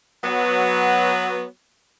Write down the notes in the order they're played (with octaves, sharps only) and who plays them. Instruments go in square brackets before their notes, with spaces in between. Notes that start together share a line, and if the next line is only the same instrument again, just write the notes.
[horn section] F#3 B3